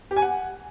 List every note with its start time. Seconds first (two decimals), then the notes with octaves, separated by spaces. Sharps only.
0.11 G4
0.17 G#5
0.22 F#5